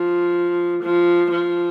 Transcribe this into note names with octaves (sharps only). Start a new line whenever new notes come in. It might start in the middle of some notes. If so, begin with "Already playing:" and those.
Already playing: F3
F3
F3